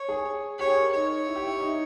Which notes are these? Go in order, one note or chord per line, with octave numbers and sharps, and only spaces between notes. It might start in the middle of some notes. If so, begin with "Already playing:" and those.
Already playing: C#5
G#4
G4 C#5
G#4
A#4
D#4 C#5
E4
G4
E4
D#4